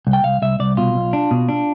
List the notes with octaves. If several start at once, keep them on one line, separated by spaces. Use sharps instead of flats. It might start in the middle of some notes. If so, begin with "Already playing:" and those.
C2
G5
C2 F5
C2 E5
C2 D5
B2 F4
B1
D4
B2
D4